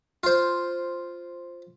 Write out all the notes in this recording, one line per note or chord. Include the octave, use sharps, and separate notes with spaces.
F4 C5